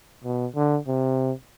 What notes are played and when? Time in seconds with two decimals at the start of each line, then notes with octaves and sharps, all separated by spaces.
0.24 B2
0.55 D3
0.87 C3